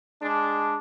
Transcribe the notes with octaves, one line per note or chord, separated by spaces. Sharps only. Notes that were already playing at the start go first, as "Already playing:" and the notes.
G#3 D4